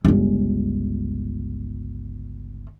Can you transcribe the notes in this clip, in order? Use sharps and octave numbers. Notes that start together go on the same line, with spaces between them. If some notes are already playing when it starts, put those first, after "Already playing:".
G1 C#2